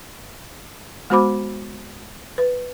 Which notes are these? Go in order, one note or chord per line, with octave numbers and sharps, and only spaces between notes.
G#3 B3 F#4 C5 B5 D6
B4